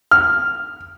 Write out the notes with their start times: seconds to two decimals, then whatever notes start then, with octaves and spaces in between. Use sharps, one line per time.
0.11 F6